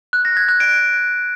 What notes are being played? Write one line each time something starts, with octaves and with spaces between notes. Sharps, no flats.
F#6
A#6
G#6
F#6
D7